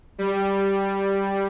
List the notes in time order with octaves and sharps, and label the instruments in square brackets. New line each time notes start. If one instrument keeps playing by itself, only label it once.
[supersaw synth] G3